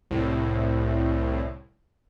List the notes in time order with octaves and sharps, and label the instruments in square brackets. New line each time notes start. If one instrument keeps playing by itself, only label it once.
[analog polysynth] C2 A2